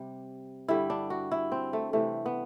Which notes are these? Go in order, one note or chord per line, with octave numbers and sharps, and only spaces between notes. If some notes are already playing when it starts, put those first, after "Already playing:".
Already playing: C3 G3
G2 D3 G3 E4
D4
F#4
E4
C4
A3
C3 E3 G3 A3
B3